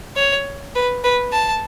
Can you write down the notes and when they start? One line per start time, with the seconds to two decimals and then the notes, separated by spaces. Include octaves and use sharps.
0.16 C#5
0.75 B4
1.04 B4
1.33 A5